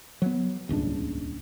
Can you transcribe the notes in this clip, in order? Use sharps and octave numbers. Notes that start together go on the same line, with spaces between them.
F#3 B3
D#1 C#2 G#2 D4